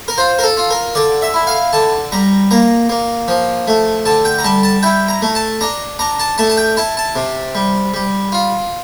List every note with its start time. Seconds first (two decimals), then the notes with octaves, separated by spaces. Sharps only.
0.08 A#4
0.18 F4 C5
0.39 A#4
0.44 A4
0.57 F4
0.70 A#4
0.95 D3 D5
1.22 E5
1.34 E4
1.47 F5
1.73 D3 A5
2.12 G3 A#5
2.51 A#3 A#5
2.89 A#3
3.28 F3
3.68 A3
4.06 D3 A5
4.25 G5
4.39 A#5
4.44 G3 A5
4.63 A5
4.83 E4 G5
5.09 A#5
5.22 A3
5.35 A5
5.61 D4 A#5
5.99 D4 A#5
6.20 A5
6.38 A3 A5
6.50 A5
6.57 G5
6.77 E4 A5
6.97 A5
7.16 C3
7.55 G3
7.94 G3
8.32 F4